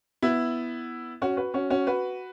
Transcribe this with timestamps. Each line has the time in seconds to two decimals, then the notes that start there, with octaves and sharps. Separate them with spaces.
0.22 B3 E4
1.22 C#4 F#4
1.37 F#4 B4
1.54 C#4 F#4
1.70 C#4 F#4
1.87 F#4 B4